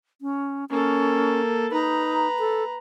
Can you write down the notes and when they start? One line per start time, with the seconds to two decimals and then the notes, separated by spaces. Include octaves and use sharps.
0.21 C#4
0.69 A#3 C#4 A4
1.72 D#4 B4 A#5
2.39 A4